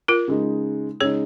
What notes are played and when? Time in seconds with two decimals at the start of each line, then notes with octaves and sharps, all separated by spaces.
0.08 F4 A#4
0.28 C#3 G#3 D#4
1.00 C#3 G#3 D#4 G#4 C#5